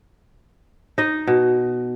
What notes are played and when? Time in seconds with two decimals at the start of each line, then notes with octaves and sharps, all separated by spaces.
0.98 D#4 D#5
1.27 B2